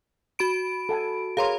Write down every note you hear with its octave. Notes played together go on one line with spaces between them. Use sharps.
F#4 B5 D7
A4 F#5 G#5
G#4 A#4 C#5 F5 A#5 C6